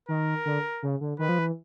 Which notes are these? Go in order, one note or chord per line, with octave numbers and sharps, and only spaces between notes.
D#3 A#4
D3
C#3
D3
D#3 B4
F3
E3